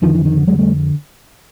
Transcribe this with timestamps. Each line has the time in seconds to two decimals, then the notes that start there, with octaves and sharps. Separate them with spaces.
0.02 F2 D3 D#3 F3
0.15 E3
0.25 D#3
0.37 D3
0.47 F2 D3 F#3 G#3
0.59 G3 A3